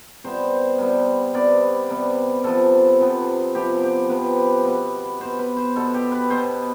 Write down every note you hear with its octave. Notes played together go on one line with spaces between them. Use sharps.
C3 G3 B3 C5
C3 G3 B3
C3 G3 B3 D5
C3 G3 B3
C3 F3 B3 A4
C3 F3 B3
C3 F3 B3 G4
G4
C3 F3 B3 B4
B2 B3
B2 B3 C5
B4
C5
B2 B3 A4
G4
B4
B2 B3 C5